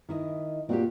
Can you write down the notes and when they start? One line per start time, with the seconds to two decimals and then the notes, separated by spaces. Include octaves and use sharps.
0.09 D#3 E4 D#5
0.69 A#2 C4 F#4 G4